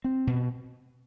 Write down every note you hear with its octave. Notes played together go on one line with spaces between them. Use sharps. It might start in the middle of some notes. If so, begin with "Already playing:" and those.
C4
B2